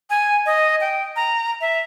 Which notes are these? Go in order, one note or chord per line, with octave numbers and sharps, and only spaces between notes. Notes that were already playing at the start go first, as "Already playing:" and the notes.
G#5
D#5
G5
A#5
E5